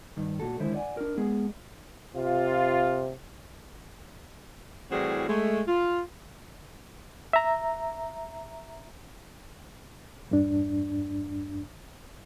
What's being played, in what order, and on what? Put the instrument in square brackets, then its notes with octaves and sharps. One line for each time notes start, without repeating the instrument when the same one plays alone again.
[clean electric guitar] G2 D#3 G3
A#2 A3 F#4 A4
D3 D#3 G#3 E4 C5
D5 F#5 G#5
D4 A#4
G#3 B3 G#4
[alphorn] C3 [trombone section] F4
[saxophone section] A2 E3 G3 C4 F#4 G#4
G#3 A3
F4
[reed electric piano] E5 A#5
E2 G2 D4